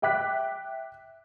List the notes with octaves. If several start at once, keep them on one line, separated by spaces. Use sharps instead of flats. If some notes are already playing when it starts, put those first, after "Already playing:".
E5 G5 D6 F#6 B6